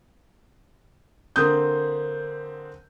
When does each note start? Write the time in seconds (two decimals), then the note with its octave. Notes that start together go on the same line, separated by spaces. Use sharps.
1.36 D3 A#3 C4 D#6 G6